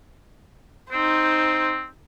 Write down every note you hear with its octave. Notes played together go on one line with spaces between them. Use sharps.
C4 D#4 C5